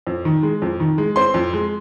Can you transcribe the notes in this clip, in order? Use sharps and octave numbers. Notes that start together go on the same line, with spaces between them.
F2
D#3
G#3
F2
D#3
G#3
C4 C6
F2
G#3